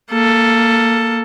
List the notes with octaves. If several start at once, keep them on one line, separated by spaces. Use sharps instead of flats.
A#3 A4